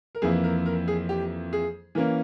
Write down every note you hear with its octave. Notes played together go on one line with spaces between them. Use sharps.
A#4
F2 E3 A#3 E4 G#4
A#4
A#4
G#4
G4
G#4
E3 A#3 C#4 A#4